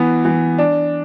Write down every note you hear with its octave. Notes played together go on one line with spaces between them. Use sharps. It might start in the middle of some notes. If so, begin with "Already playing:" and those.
Already playing: E3 B3
E3
D4